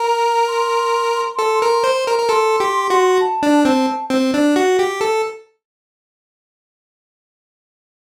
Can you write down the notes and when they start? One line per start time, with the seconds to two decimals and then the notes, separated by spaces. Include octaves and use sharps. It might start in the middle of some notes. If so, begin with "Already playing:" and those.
Already playing: A#4 A#5
0.48 C6
1.39 A4
1.62 A#4
1.84 C5
2.07 A#4
2.19 A#4
2.29 A4 C6
2.60 G4
2.90 F#4
3.21 A5
3.43 D4
3.65 C4 A5
4.10 C4
4.34 D4
4.56 F#4
4.79 G4
5.01 A4